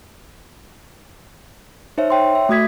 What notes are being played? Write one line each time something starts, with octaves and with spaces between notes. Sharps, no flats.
D#4 C5 C#5 E5
C#5 G5 C6
E5
A3 F#4 D#6 G#6 B6